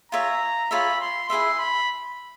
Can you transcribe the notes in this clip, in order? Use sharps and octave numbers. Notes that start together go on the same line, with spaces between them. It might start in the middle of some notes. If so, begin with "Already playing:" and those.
F4 G#4 C#5 E5 A#5
F4 G#4 C#5 E5 B5
C6
E4 G#4 B4 E5 C6
B5